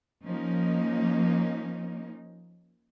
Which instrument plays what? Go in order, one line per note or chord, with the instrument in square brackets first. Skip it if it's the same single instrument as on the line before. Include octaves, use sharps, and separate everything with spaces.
[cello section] F3 A#3 C#4 D#4